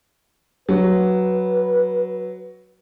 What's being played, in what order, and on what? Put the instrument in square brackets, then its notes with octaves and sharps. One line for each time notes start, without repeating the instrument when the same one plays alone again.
[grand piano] F#3 [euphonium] B4